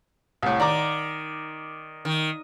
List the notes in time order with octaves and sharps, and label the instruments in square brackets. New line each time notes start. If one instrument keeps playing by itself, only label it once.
[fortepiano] C2 A2
[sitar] D#3 [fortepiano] D5 A#5 D6
[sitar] D#3